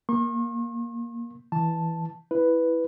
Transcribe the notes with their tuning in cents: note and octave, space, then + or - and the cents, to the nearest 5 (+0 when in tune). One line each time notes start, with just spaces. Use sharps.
A#3 +10 C#6 -45
E3 +0 A5 +0
E4 +0 B4 +0